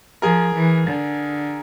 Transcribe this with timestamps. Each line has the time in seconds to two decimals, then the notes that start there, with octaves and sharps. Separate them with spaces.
0.22 F3 G#4 A#4
0.55 E3
0.87 D3